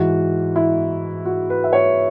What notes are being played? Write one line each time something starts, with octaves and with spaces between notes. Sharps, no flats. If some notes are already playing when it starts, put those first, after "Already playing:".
Already playing: G#2 E3 F#4
E4
F#4
B4
E5
C#5